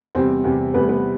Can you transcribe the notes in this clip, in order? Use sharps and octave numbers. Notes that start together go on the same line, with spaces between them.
E2 C3 G3 C4 C5
E2 C3 G3
E2 C3 G3 B3 B4
B3 B4